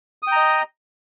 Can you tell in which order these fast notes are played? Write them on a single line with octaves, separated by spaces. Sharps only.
D#6 G5 A#5 D#5